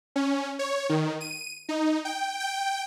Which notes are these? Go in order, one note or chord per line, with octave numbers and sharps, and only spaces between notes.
C#4
C#5
D#3
D#7
D#4
G5
G5